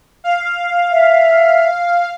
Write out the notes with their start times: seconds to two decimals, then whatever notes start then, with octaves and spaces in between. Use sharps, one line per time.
0.24 F5
0.92 E5